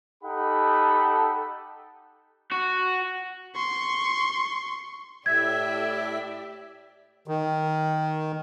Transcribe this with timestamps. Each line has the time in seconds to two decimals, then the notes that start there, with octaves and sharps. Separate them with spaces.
0.24 D#4 G4 A4 F#5 G5 B5
2.51 F#4
3.55 C6 C#6
5.26 A2 G4 D5 E5 G#6
7.28 D#3